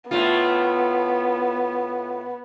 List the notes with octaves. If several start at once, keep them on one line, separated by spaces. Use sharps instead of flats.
A2 A3 B3 F4